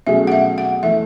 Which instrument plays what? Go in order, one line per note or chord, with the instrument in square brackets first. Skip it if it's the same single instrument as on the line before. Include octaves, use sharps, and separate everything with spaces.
[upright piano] B2 F#3 A3 C#4 G#4 [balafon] E5
[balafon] F#5
E5
F#5
[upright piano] E3 A3 [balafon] E5